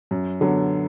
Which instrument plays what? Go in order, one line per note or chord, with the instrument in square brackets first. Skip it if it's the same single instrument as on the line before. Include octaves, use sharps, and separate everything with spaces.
[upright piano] F#2
D3 F#3 B3